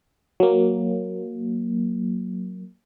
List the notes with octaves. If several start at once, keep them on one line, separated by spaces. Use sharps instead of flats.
F#3 A#3